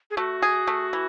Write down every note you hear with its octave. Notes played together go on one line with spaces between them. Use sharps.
G#4
A3 F#4
G#4
A3
E3